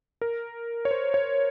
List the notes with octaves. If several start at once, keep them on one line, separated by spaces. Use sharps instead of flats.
A#4
C#5
C5
C#5